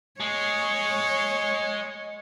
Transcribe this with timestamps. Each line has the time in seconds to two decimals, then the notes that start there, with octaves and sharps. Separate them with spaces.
0.20 G#3 C#5